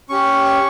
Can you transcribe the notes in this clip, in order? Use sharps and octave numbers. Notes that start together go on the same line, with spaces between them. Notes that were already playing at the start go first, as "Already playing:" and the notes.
C#4 G4 C#6
C#6